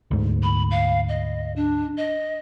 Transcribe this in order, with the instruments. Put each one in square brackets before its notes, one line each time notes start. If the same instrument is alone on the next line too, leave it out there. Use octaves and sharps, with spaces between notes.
[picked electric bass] D2 G#2
[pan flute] B5
F5
D#5
D4
D#5